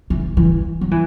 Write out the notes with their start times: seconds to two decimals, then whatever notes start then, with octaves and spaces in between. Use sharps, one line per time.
0.10 E3
0.37 E3
0.81 F#3
0.91 E3